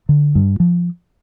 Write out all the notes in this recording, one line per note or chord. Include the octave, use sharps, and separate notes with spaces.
D3
G2
F3